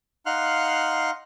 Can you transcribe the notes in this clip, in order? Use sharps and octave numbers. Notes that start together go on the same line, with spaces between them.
D#4 F5 F#5 C6 F6 F#6